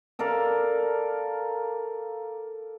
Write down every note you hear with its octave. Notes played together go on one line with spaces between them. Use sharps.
A4 A#4 D5 F5